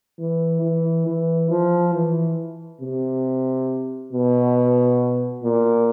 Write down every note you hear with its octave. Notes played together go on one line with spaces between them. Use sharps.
E3
E3
E3
F3
E3
C3
B2
A#2